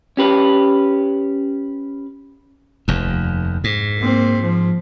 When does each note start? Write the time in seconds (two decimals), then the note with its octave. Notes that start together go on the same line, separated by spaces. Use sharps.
0.17 C#4 G4 B4
2.88 F1 D#2
3.64 G#2
3.98 A#3 C4
4.41 F3